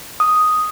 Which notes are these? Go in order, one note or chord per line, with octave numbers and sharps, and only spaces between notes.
D#6